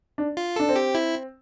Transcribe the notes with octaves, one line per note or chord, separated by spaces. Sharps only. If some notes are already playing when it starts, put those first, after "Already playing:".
D4
F4
D4 A4
C4
G4
E4